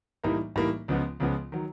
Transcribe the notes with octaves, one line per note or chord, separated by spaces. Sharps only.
A2 E3 G3 A#3 D#4
A2 E3 G3 A#3 D#4
C#2 C#3 F3 G#3 B3
C#2 C#3 F3 G#3 B3
D#3 F#3